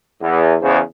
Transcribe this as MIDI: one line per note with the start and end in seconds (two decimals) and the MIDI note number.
0.21 0.54 40
0.62 0.80 40
0.62 0.80 49
0.62 0.80 72